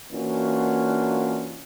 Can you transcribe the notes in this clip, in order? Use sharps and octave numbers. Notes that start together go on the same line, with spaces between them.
E3 A#3 C#4 D4 F4 F#4